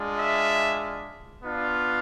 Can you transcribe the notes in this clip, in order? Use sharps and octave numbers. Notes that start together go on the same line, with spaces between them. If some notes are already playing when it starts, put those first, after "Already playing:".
Already playing: G#3 D4 F4
E5
B3 D4 F4